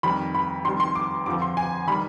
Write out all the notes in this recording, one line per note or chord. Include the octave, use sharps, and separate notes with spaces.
F2 D#3 G3 B5
B5
F2 D#3 G3 C6
C6
D6
F2 D3 F3 D6
C6
G#5
D#3 G3 B5